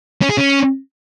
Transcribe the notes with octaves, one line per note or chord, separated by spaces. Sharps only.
C#4
G#4
C#4